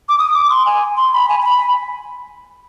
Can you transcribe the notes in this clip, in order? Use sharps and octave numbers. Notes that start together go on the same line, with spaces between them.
D6
D#6
D6
C6
G#5
C6
B5
G#5
G#5
B5